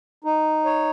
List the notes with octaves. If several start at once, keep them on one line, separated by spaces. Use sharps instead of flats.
D#4
C#5